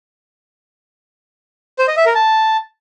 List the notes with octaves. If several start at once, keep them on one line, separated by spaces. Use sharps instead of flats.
C5
D#5
E5
A#4
A5